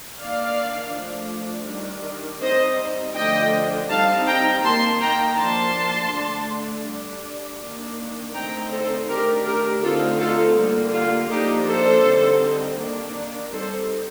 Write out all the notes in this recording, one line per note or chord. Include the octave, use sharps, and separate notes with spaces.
D#3 A#3 D4 D5 F5
F3 A3 D4
D#3 G3 D4
G3 C4 D#4 C5 D#5
D3 F3 A3 D4 D#5 G5
G3 C4 D#4 F5 A5
G5 A#5
D#3 A#3 D#4 A5 C6
G5 A#5
F3 A#3 D4 A5 C6
D3 A3 D4
G3 D4
D#3 A#3 D4
D3 A3 C4 D#4 G5 A#5
A4 C5
D#3 A3 D4 G4 A#4
G4 A#4
D3 A3 C4 D#4 F4 A4
F4 A4
D3 G3 A#3
F4
F3 A#3 D4 D#4 G4
A4 C5
D3 G3 C4 D#4
D#3 A#3 D4
G3 C4 D#4 A4 C5